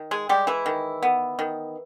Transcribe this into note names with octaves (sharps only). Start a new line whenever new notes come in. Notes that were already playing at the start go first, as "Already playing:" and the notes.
Already playing: D#3
G#3 G#4
G3 G#3 G4
E3 E4
D#3
B3
D#3